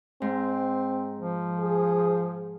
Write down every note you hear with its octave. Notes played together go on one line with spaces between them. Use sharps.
G#2 C4
F3
G#4